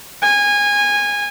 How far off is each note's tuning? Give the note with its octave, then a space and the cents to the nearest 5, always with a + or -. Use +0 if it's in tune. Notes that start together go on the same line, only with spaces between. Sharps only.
G#5 -20